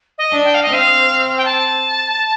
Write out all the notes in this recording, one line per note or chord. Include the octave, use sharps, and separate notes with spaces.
D#5
D4
G5
F5
D#5
C4 F5
G5
A5